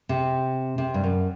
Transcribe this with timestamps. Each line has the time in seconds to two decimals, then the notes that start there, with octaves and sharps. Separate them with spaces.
0.09 C3
0.78 C3
0.94 G2
1.04 F#2